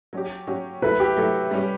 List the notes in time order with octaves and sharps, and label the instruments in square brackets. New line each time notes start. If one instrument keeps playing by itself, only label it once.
[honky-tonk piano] F#3 C#4 G4
F#3 C#4 G4
[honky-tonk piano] F#3 A3 E4 A4 [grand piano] B4
[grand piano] G4
[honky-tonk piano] F#3 A3 E4 A4
G3 C#4 G4